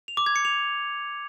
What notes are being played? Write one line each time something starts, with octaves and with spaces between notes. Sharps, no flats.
F7
D6
G#6
C#7
F7